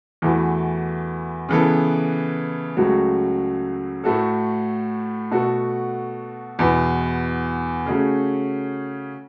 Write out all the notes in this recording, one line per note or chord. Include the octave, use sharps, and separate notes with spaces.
E2 E3 A3 F#4
C#3 E3 B3 A4
C#2 C#3 F#3 A3 F#4
A2 A3 F#4 A4
B2 A3 F#4 A4
E2 B2 B3
C#3 A3 C#4 F#4